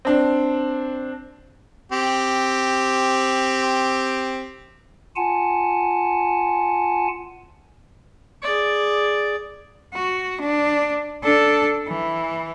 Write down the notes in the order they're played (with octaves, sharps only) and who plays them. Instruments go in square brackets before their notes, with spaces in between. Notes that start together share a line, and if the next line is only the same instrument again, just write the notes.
[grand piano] C4 D4
[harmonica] C4 G4
[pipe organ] F4 F#5 G#5 A5
[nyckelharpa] G#4 D5
[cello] F#4
D4
D4 A4
E3